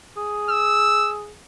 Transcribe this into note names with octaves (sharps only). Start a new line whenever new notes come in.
G#4
E6